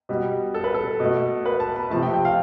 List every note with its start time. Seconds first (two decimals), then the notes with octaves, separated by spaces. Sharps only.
0.09 B2 G3
0.54 A4
0.64 B4
0.74 A4
1.00 B2 A3
1.46 B4
1.60 A5
1.76 B5
1.90 C3 F3 A3 A5
2.03 G5
2.13 G5
2.25 F5